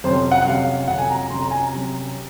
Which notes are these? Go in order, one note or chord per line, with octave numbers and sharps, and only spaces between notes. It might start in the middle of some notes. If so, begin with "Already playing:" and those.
F2 C3 F#3 C#4 C5
F#5
F#5
F2 C3 F#3 C#4 F5
F2 C3 F#3 C#4 F#5
G#5
A#5
A#5
F2 C3 F#3 C#4 C6
A#5
G#5
A#5
C3 F#3 C#4